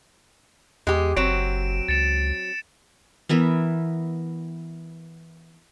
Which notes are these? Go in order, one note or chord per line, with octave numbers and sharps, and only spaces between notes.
E2 G#3 G4
F#1 F#3 C4 D7 E7
C#2 A6 C#7 E7
E3 B3 A#4 E5